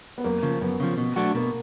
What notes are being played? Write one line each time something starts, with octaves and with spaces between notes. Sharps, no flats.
B3
F#2 A#3
C#3 F3
F#2 B3
C#3 F3
B2
F#3 A3 D4 F#4
B2 A#3